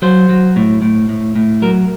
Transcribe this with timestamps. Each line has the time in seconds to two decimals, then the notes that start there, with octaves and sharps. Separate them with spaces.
0.02 F#3 C5
0.29 F#3
0.56 A2
0.82 A2
1.09 A2
1.35 A2
1.62 F#3 A#4